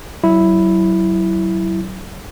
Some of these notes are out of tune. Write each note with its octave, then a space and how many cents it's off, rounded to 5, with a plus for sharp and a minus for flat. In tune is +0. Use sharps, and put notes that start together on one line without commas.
F#3 +30 E4 +0